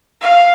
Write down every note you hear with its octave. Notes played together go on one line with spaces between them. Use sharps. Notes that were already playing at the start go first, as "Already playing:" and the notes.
F5